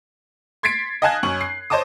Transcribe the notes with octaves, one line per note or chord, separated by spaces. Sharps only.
C6 G#6 A6 B6 C7 D7
D#5 F5 G#5 A5 F#6 G#6
F#2 C#4 C#6 F#7
C7
C5 C#5 D#5 A5 D6 D#6